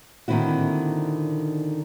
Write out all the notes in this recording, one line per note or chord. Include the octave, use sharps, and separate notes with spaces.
A#2 D3 D#3 C4 E4 F#4